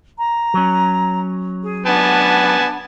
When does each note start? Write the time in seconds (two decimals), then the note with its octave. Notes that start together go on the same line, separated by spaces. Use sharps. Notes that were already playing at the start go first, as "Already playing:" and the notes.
0.18 A#5
0.54 F#3 C#4
1.61 G#4
1.86 B3 D4 F#5 G#5 A5 B5